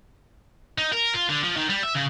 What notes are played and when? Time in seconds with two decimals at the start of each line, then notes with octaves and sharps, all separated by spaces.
0.78 D#4
0.92 A#4
1.14 F4
1.29 D3
1.43 F3
1.56 D#3
1.69 G3
1.83 E5
1.95 C#3